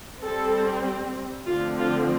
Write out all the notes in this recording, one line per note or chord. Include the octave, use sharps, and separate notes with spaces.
G3 C4 A4
D3 F3 A3 C4 F4
F4